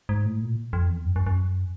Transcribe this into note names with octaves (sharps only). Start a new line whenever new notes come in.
G#2
A2
A#2
F2
E2
F#2
F#2
F#2